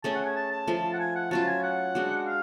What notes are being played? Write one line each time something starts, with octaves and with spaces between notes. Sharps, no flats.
A3 C#4 G#4 A5
F#5
G#5
A5
A5
F3 A3 F4
F#5
G#5
F#5
F#3 C#4 F4 A5
G#5
F#5
G#3 D4 F#4
F5